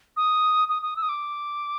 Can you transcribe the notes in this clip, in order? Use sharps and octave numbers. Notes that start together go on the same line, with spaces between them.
D#6
D#6
D#6
E6
D#6
D6